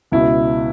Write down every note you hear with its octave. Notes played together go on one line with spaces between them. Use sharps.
C#2 B2 E4